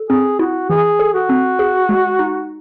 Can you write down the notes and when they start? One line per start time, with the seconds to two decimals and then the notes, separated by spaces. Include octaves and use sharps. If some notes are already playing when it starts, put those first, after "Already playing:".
Already playing: A4
0.10 C4 G#4
0.39 E4 F#4
0.69 E3 G#4
0.99 A4
1.14 F#4
1.29 C4
1.59 G#4
1.89 G#3
2.19 D#4